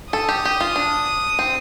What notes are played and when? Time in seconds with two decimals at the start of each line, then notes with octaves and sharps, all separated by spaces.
0.13 A4 D#6
0.29 G4
0.45 G4
0.60 F4
0.76 D4
1.39 C4